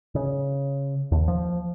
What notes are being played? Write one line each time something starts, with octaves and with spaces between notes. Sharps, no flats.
C#3
D#2
F3